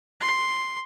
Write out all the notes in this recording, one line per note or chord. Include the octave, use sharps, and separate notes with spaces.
C6